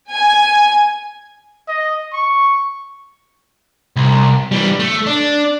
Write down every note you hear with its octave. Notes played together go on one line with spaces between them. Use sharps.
G#5
D#5
C#6
C2
E3 G3
A3
D4